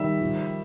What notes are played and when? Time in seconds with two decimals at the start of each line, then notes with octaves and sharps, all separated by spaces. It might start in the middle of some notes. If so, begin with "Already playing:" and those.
Already playing: D#3 G3 E5
0.21 F3